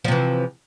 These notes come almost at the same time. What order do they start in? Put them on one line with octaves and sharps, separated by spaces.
F3 C3 E3